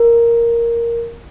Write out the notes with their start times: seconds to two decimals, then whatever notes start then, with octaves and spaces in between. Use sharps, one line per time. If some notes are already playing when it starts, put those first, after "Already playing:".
Already playing: A#4